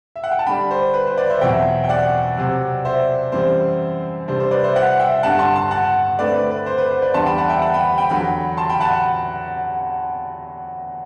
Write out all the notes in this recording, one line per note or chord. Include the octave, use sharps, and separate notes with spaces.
E5
F#5
G5
A5
D3 G3 D4 G5 B5
C5
B4
C5
B4 D5
C5 E5
E2 B2 F#3 C4 E4 E5 G5
G5
D5 F#5
C3 F#3 C4
C5 E5
F#2 E3 G3 C4 C5
C3 G3 D4 C5
C5
B4 D5
C5 E5
D5 F#5
E5 G5
G2 D3 G3 F#5 A5
A5 C6
A5 C6
F#5 A5
D3 A3 C4 B4 D5
B4
B4
C5
B4
C5
B4 D5
E2 D3 G3 B3 D4 A5 C6
G5 B5
F#5 A5
E5 G5
F#5 A5
G5 B5
G5 B5
E2 D3 F#3 G5 B5
A5 C6
G5 B5
F#5 A5